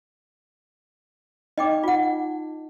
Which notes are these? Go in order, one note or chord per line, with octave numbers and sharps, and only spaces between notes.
D#4 D#5 G5 D6
F4 F#5